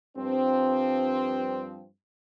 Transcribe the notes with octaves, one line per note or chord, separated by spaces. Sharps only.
G2 F3 C4